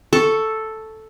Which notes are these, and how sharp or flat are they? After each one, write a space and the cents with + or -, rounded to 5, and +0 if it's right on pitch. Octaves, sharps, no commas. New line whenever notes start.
A4 +0 C#6 +0